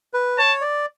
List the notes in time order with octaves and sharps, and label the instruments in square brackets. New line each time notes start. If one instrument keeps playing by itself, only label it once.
[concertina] B4
[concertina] C#5 [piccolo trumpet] A5
[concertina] D5